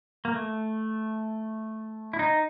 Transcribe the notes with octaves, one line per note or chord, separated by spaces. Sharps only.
A#3
A3
E4
D#4